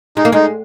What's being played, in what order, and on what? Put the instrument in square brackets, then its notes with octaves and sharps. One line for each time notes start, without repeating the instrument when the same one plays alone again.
[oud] G#3 [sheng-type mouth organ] D#4
[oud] A#3
[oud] G#3 [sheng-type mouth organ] D#4